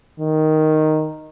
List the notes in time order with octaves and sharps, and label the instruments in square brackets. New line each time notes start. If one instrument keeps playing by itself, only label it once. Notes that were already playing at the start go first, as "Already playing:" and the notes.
[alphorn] D#3